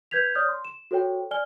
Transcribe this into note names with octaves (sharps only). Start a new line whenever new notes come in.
B4 G6 G#6 B6 F7
C#5 D5 D#6 F6 G6
C6
E7
F#4 A4 C5 C#5 G5
D5 G#5 F6 G7